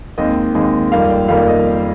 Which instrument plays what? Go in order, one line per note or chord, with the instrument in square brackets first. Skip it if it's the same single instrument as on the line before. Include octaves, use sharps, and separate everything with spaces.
[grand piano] D#2 D#3 G#3 C4 D#5
D#2 D#3 G#3 C4
F2 D#3 G3 A#3 F5
G5
F2 D#3 G3 A#3 F5
D#5